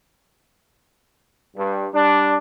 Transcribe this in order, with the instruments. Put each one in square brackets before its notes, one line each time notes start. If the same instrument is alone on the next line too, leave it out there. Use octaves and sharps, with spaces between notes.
[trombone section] G2
G3 D4